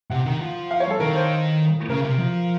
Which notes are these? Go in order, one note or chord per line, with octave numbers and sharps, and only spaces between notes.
C3 F#5
D#3
F3
F5
C#5
A4
D#3 A#4
C5
C#3 A#4
C3
F3